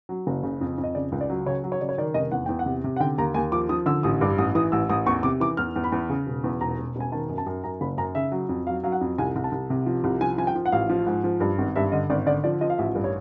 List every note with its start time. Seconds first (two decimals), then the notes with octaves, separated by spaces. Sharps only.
0.09 F#3
0.27 F#1
0.43 C#3
0.61 F2
0.78 F2
0.84 D#5
0.95 C#3 D5
1.12 C#2
1.21 D5
1.29 F#3
1.46 C#3 C#5
1.64 F#3
1.72 C#5
1.81 C#3 D5
1.89 C#5
1.98 D#3 D5
2.14 F1 D#5
2.32 E2 F#5
2.46 E2 G5
2.59 F#5
2.66 C3
2.84 C3
2.96 F#5
3.00 D3 G5
3.18 D#2 A#5
3.34 D#2 G#5
3.52 F3 D6
3.69 F3 D#6
3.86 D3 E6
4.03 A1 D#6
4.21 G2 D6
4.38 A1 D#6
4.55 E3 D#6
4.72 A1 E6
4.90 A1 D#6
5.06 E2 C#6
5.23 C3 D6
5.40 E3 D6
5.57 E2 F6
5.76 E2
5.84 B5
5.92 E2
6.09 C#3
6.27 E1
6.44 E2
6.61 E1 A#5
6.78 E1
6.96 E1 G#5
7.12 D#3 A5
7.29 F#2
7.38 A5
7.46 F#2
7.64 F#2 A#5
7.81 F#1 B5
7.98 F#2 A#5
8.15 C#3 E5
8.32 F#3
8.49 F2
8.67 F#3 F5
8.83 F#3 F5
8.92 F#5
9.01 F2
9.18 C2 G#5
9.36 C2
9.44 A5
9.52 C2
9.70 C3
9.86 F3
10.04 C2
10.21 F3 G#5
10.38 F3 G#5
10.47 G5
10.56 F3
10.66 F#5
10.72 A1 F5
10.90 F3
11.06 G#2
11.24 F3
11.40 G2
11.58 G#1
11.76 G2 E5
11.92 D3 D#5
12.10 G#1 D5
12.26 D3 D5
12.44 F3 D5
12.61 F3 D#5
12.70 F5
12.78 A1 E5
12.95 G2
13.04 C#5